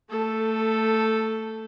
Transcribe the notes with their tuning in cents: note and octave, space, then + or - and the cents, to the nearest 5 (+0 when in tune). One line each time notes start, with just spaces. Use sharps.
A3 +20 A4 +0